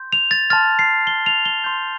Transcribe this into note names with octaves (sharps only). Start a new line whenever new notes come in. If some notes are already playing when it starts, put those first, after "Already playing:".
Already playing: C6 G6
F7
A6
A5 C6 F6 A6
C7
G7
F7
G7
C6 G6